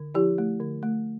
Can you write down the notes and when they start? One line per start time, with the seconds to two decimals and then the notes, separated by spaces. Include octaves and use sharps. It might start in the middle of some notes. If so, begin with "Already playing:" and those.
Already playing: D3
0.15 F3 E4 G4
0.38 A3
0.60 D3
0.83 A3